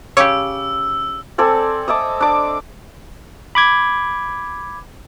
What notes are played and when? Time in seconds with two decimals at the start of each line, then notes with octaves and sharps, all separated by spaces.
0.17 C#3 G4 C#5 D6 E6
1.38 C4 A4 D5 G#5
1.88 D#5 E5 A5 D6
2.20 D4 D6
3.55 B5 D6 G#6